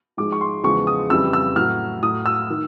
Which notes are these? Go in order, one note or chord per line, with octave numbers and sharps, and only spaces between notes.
G#2 F3 G#3 D6
C#6
C6
E2 C#3 F3 G#3 C#6
D#6
F2 C#3 E3 G3 E6
E6
A2 F#3 F6
A2 F#3 D#6
E6
D#3